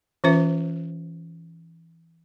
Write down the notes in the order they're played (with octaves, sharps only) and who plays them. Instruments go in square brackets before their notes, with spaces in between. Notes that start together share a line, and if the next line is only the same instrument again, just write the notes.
[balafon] E3 C#4 F4 B4 C5 E5